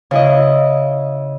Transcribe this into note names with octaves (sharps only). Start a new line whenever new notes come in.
C#3 E4 D#5